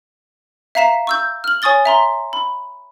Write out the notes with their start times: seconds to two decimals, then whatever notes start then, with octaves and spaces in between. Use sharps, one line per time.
0.75 E5 F5 A#5 B6 E7
1.07 C#6 E6 G6
1.44 F6 F#7
1.62 C#5 G#5 C#6 D#6 A6 G7
1.85 E5 A#5 C6
2.33 B5